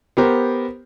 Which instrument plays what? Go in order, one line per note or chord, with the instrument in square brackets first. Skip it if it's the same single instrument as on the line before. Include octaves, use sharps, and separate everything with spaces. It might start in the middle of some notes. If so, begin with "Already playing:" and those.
[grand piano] B3 G4 A#4 C5